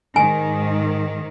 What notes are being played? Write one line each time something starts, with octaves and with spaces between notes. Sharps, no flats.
G#2 D#3 G#5